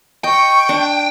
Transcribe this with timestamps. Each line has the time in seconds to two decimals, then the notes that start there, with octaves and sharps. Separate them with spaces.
0.24 D#5 G5 C#6
0.69 D4